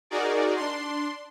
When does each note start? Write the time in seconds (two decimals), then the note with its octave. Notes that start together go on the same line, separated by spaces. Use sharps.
0.10 D#4 F#4 G#4 A#4 D5
0.56 D4 C6